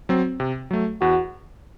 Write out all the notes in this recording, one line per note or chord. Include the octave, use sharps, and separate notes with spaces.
F#3 C4
C3
F#3 A3
E2 F#4